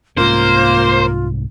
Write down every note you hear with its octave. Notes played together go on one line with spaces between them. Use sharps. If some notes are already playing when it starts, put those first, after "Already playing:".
C2 G#2 A#3 C#4 F4 C5